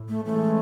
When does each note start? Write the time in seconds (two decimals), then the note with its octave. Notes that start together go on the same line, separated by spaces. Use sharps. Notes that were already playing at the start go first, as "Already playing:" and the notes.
Already playing: A2
0.09 A3
0.25 E3 G#3 A3 C#4